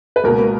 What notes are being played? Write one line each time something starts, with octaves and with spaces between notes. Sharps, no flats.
B4
C#2 B2 A#3 A#4